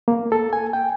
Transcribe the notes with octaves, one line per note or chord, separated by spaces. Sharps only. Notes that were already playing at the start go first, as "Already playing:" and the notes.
A#3
A4
G#5
G5